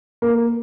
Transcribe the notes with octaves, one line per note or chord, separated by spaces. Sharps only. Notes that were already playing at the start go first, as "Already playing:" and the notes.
A#3